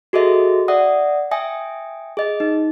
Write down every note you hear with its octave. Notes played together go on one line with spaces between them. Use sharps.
F#4 G#4 A4 D#5 E5
D5 E5 F#5 D#6
E5 G5 G#5 D#6
G#4 D#5
D#4